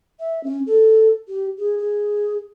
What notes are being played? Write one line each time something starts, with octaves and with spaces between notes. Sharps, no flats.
E5
C#4
A4
G4
G#4
G#4